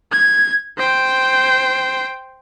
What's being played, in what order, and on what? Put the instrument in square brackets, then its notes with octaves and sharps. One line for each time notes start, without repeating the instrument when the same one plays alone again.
[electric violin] G#6
C5 G5